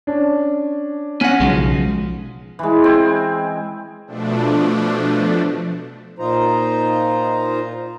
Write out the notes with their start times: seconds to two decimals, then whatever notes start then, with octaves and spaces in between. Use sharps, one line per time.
0.07 C#4 D4
1.21 B3 C#4 F#5 F6 A#6
1.40 B1 C#3 F3 G#3
2.59 E3 G#3
2.84 C4 G#5
4.07 B2 F3 A3 D4
6.19 A#2 D#4 F4 C5 A#5